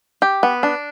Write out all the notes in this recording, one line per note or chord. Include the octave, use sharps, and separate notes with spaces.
G4
B3
D4